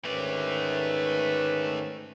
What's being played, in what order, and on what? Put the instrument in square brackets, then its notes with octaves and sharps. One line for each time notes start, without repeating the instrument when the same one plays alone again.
[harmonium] G#2 D#3 C#4 [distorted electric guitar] A3 D5 [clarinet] B4